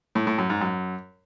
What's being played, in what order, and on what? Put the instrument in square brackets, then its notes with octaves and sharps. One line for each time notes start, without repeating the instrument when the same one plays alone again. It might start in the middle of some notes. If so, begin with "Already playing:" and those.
[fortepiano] A2
A2
F#2
G#2
F#2